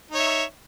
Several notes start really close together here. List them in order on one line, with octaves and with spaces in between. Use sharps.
D#4 C#5 E5